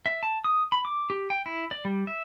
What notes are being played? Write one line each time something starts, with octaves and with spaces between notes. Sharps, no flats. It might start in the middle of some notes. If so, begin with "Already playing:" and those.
E5
A5
D#6
B5
D6
G4
G5
E4
D5
G3
E5